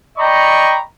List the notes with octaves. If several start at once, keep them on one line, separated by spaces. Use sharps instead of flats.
D5 D#5 G5 A#5 B5 C#6